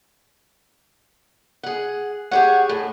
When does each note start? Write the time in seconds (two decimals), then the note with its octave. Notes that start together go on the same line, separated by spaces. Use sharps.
1.63 G#4 F#5
2.31 G4 G#4 C#5 F#5
2.69 A2 G#5